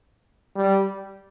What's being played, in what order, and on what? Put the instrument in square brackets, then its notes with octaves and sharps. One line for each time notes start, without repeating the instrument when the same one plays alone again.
[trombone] G3